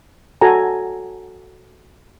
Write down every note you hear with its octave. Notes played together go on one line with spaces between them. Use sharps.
F#4 A4 G#5 A#5